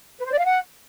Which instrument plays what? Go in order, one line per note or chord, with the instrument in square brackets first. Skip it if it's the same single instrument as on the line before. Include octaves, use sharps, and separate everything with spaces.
[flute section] B4
C5
D5
F5
F#5